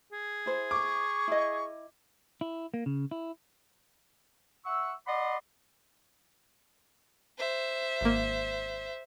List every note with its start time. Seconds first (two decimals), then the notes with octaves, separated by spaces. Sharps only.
0.13 G#4
0.46 E4 C5
0.71 C#6 D6
1.28 E4 D#5
2.41 E4
2.74 A#3
2.86 C#3
3.11 E4
4.66 E5 F#5 C#6 E6
5.07 D5 D#5 F#5 B5 C6 D6
7.38 C5 E5
8.01 G#1 A#3